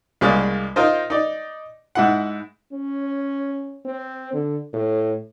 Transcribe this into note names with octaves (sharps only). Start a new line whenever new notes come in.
C2 C#3 G#3 A#3 D5
D#4 F4 A#4 C5 D#5
D#4 D5
G#2 E4 F#5
C#4
C4
D3
A2